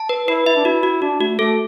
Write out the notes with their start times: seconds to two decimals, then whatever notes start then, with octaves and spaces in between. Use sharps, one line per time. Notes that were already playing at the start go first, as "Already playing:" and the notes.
Already playing: A5
0.09 B4
0.28 E4 B4
0.46 E4 E5
0.56 D4
0.65 E4 F#4
0.83 F#4
1.02 D4 F#4
1.20 A3 F#4
1.39 A3 A4